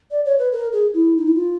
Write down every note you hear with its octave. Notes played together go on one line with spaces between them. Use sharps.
D5
C#5
B4
A#4
G#4
E4
D#4
E4
F4